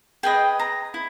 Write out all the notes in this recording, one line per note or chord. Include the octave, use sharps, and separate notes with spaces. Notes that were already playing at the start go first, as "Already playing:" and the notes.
G#4 B4 D#5 G5
A#5
E4